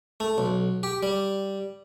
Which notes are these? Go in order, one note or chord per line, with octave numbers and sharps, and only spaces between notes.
A3
B1
G4
G3